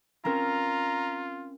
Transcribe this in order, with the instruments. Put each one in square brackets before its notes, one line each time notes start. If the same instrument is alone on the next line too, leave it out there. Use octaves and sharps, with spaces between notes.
[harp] C4 C#4 A#4 [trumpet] F4 [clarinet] A#5